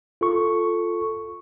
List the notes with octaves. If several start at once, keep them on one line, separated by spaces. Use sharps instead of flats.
F4 A4 C#6